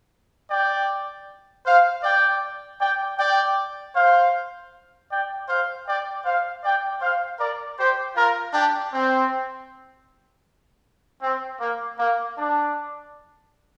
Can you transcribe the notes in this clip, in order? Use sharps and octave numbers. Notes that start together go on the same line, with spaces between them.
D5 G5
C5 F5
D5 G5
D5 G5
D5 G5
C5 F5
D5 G5
C5 F5
D5 G5
C5 F5
D5 G5
C5 F5
A#4 D5
G4 C5
F4 A#4
D4 G4
C4
C4
A#3
A#3
D4